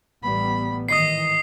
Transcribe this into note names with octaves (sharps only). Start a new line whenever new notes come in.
A1 G3 B3 B5
G#2 D#3 E3 D#5 D#6 C7